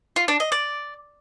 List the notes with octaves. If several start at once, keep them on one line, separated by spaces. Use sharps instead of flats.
F4
D4
D#5
D5